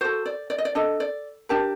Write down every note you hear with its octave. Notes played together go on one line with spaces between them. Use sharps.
F#4 A4 C5
D5
D5
D#5
D5
D4 A4 D#5
D5
D4 G4 A#4 A5